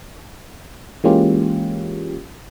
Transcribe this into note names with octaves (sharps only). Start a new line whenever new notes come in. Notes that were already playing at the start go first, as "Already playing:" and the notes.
E3 G#3 A#3 C#4 F4 G4